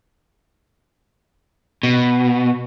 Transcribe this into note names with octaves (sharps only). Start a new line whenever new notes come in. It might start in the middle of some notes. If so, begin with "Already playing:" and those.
B2